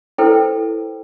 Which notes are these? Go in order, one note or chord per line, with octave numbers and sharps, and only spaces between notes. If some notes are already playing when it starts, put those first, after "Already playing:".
E4 A4 B4 C5 G5